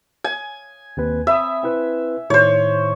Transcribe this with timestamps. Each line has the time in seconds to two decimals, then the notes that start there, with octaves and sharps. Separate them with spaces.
0.24 G#5
0.97 D#2 C4 B4
1.27 C4 E5 B5 D#6
1.63 C4 E4 B4
2.30 A2 D#3 C5 C#5